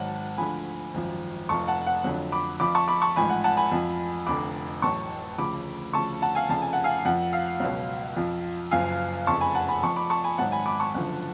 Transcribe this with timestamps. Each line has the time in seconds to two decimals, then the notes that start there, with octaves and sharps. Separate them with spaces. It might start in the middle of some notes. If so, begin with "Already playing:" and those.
Already playing: G#1 G#2 F#3 F#5 A5
0.38 D2 D3 F3 G#5 B5
0.94 G#1 F#2 F3
1.49 F1 F2 F3 A5 C#6
1.68 F#5 A5
1.87 F#5
2.04 F2 D3 F#3
2.32 B5 D6
2.60 F2 F3 B5 D6
2.75 A5 C#6
2.88 B5 D6
3.02 A5 C#6
3.16 A1 G#2 F3 G#5 B5
3.30 F#5
3.44 F#5 A5
3.57 G#5 B5
3.72 F2 F3
4.27 F1 F2 D3 B5 D6
4.82 A1 A2 F#3 A5 C#6
5.38 D2 C#3 F3 B5 D6
5.93 D2 C#3 F3 A5 C#6
6.22 F#5 A5
6.35 F5 G#5
6.49 F1 F2 C#3 A5
6.62 G#5
6.73 F#5
6.84 F5 G#5
7.05 F2 F3 F#5
7.33 F5
7.60 C#2 B2 F#3
8.17 F2 F3
8.71 F#1 F#2 F3 F5 G#5
9.27 F1 F2 C#3 A5 C#6
9.41 G#5 B5
9.55 F#5 A5
9.68 G#5 B5
9.83 F2 F3 A5 C#6
9.96 B5 D6
10.10 A5 C#6
10.24 G#5 B5
10.38 G#1 G#2 F#3 F#5 A5
10.52 G#5 B5
10.66 B5 D6
10.80 A5 C#6
10.94 F#1 F#2 D3 F3